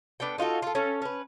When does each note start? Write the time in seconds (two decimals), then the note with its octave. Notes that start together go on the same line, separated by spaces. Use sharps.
0.20 B3 D4 A4 G5
0.38 D#4 F4 F#4 A4
0.62 F4 A4
0.75 C#4 A4
1.02 C#4 B4